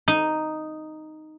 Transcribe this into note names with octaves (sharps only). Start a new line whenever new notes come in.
D#4